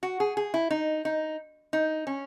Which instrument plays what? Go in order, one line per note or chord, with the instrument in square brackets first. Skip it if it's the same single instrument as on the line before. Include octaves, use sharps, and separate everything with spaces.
[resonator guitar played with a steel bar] F#4
G#4
G#4
E4
D#4
D#4
D#4
C#4